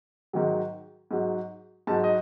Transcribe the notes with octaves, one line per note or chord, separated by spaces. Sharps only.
G#2 D#3 F#3
G#2 F#3
G#2 F#3 A5
D#5